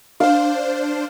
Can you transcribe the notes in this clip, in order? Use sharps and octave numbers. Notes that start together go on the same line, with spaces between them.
D4 C5 F5